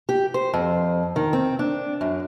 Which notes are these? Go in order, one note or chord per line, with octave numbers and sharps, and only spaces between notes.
G4
C5
F2
D#3
C4
D4
F#2